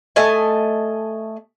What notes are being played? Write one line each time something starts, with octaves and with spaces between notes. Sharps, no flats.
A3 D#5 G#5 A5